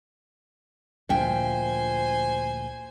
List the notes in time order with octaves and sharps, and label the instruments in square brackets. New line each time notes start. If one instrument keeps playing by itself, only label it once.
[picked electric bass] D2 A#2 F3 [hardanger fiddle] C5 G#5 [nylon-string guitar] E5 G5